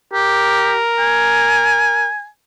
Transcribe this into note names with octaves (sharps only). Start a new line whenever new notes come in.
G4 A#4
G#5